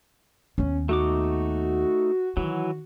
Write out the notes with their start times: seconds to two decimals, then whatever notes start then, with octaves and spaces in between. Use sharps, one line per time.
0.58 D#2 B3 C#4
0.89 A3 D#4 F#4 D6
2.37 D#3 E3 F#3 F#4